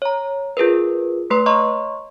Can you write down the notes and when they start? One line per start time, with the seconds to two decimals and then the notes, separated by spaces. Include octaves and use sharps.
0.02 C#5 A#5
0.57 F4 G#4 A#4 B4
1.30 A3 B4 C6
1.46 C#5 D#5 A#5 C6 C#6